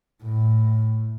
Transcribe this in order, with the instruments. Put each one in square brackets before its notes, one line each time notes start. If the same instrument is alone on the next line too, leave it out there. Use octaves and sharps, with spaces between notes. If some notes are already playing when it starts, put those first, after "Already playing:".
[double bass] A2